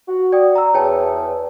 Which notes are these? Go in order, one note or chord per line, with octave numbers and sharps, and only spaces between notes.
F#4
D5 G5 D#6
A#5 E6
E2 C#5 G5 A5